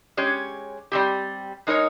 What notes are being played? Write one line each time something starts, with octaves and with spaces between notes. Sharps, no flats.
G#3 C#4 G4 C#5
G3 C4 G4
G#3 D#4 A#4 C#5